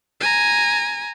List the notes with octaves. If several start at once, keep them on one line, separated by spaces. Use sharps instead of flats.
G#5 A#5